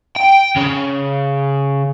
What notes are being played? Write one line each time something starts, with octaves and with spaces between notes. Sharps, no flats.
G5
C#3